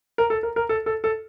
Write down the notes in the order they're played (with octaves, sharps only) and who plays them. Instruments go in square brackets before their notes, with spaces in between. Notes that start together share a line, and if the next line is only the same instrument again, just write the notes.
[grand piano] A#4
A4
A#4
A#4
A4
A4
A4